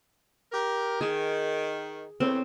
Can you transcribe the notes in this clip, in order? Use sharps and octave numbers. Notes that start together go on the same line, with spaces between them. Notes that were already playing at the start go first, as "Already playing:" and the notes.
G4 A#4
D#3 G#4
E2 A2 C#3 C4